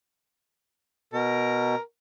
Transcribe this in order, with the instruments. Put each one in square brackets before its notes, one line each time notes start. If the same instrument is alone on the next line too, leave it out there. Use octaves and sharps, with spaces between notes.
[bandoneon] B2 [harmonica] A#4